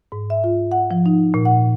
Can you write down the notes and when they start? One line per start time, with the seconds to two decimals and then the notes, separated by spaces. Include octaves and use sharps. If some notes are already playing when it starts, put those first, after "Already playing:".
0.12 G#2
0.30 E5
0.44 F4
0.72 F#5
0.91 F3
1.06 D#4
1.34 A#2
1.45 F#5